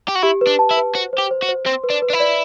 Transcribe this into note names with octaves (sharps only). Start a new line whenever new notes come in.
G4
F#4
E4 G4
B4
D4
A5
E4
B4
F#4 C5
C5
G4
C5
F#4
C5
C4 C6
B4
D4
B4
D4
E4
D5